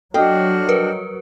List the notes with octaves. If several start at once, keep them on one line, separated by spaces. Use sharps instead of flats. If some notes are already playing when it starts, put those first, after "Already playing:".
F#3 D4 F#4 A4 D#5 G5 F6
A#4 B4